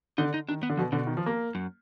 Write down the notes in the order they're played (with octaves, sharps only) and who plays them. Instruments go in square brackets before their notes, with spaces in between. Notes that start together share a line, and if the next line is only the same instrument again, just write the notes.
[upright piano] D3 [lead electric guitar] D#4
[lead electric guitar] D#4
[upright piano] D#3 [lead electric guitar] D4
[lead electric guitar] B3
[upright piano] D3
[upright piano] B2 [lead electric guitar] F3
[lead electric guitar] B2 [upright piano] D3
[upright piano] D#3
F3
A#3
[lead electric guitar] F#2